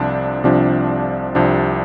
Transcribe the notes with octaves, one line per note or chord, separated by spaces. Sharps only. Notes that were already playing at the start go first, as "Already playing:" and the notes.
Already playing: C2 C3 F3 D4
C2 C3 F3 D4
C2 C3 F3 D4